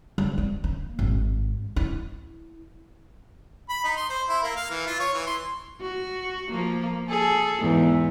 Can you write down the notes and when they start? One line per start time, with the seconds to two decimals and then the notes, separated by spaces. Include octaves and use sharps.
0.18 G3
0.38 C4
0.64 A#3
0.99 G#1
1.76 E4
3.69 B5
3.84 D#4
3.97 C6
4.09 C5
4.29 E4
4.43 A#3
4.56 F5
4.70 E3
4.87 F4
5.00 C#5
5.14 E3
5.27 C6
5.81 F#4
6.50 F3 A#3
7.08 G#4 A4
7.61 E2 G#2 E3